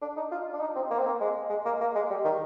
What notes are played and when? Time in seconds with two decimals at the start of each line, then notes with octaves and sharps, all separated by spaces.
0.02 D4
0.17 D#4
0.32 F4
0.53 D4
0.61 D#4
0.76 C4
0.91 A#3
0.99 C4
1.06 A#3
1.21 G#3
1.50 G#3
1.65 A#3
1.81 A#3
1.95 G#3
2.10 G3
2.25 D#3